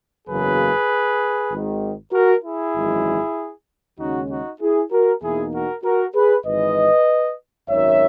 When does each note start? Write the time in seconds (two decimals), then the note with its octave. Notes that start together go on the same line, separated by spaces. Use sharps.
0.28 F#1 E2 C#3 F#3 A#3 G#4 B4
1.51 G#1 G#2 D#3
2.13 F#4 A#4
2.44 E4 G#4
2.75 G#1 F#2 E3 G#3
3.99 D#2 C#3 G#3 C#4 D#4 F#4
4.29 D#4 F#4
4.60 E4 G#4
4.91 F#4 A#4
5.22 E2 B2 A#3 D#4 E4 G#4
5.53 F#4 A#4
5.84 F#4 A#4
6.14 G#4 B4
6.46 G#1 G#2 E3 B4 D#5
7.69 G#1 F#2 D#3 C#5 E5